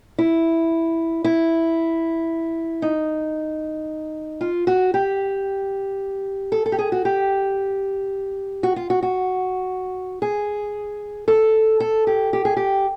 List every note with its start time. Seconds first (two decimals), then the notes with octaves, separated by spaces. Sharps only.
0.18 E4
1.24 E4
2.82 D#4
4.41 F4
4.67 F#4
4.94 G4
6.52 A4
6.66 A4
6.72 G4
6.79 G#4
6.92 F#4
7.05 G4
8.63 F#4
8.76 F4
8.90 F#4
9.03 F#4
10.22 G#4
11.28 A4
11.80 A4
12.07 G4
12.33 G4
12.45 G#4
12.57 G4